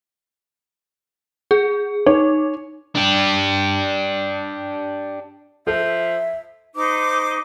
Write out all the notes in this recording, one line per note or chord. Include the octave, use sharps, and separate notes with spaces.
G#4
D#4 C#5
D4 G4
F3 A4 E5
D#4 C5 D6